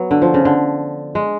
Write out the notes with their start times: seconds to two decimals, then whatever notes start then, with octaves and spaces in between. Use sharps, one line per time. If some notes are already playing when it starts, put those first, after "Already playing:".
Already playing: F#3 B3
0.11 D3
0.22 F3
0.34 C#3
0.45 D3
1.15 G#3